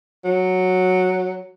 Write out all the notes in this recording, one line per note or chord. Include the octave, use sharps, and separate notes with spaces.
F#3